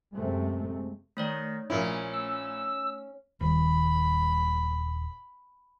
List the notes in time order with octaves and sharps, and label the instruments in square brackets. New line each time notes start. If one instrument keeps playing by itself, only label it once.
[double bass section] F#2 C3 G#3 A3 C4
[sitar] D#3 [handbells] A3 C#5 D5
[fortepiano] A#1 E4 [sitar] C#4
[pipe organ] E6
[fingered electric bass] D#1 [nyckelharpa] B5